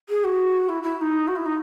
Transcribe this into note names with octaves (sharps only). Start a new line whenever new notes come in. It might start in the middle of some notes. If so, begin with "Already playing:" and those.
G#4
F#4
E4
E4
E4
D#4
F#4
E4
D#4